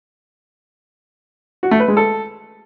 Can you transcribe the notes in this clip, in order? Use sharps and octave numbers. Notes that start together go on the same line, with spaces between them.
F#4
A3
B4
G#3
A4